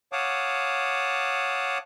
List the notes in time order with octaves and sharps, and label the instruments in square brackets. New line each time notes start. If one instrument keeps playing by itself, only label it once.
[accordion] C#5 F5 F#5 A5 D6 D#6